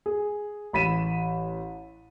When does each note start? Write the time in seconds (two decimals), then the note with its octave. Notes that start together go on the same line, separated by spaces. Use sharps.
0.06 G#4
0.73 A1 B5 B6 D#7 E7